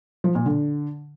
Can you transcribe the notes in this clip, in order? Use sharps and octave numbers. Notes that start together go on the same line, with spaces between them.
F3
A#2
D3